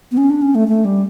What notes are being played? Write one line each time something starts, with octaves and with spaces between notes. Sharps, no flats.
B3
C#4
D4
C#4
A3
A3
G3